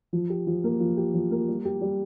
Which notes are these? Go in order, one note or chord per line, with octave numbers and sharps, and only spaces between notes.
F3
G4
F3
A#3
F3
G4
F3
A#3
G3
G4
G3